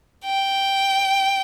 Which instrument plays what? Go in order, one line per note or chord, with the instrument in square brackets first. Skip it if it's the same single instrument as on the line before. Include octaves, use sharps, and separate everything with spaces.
[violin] G5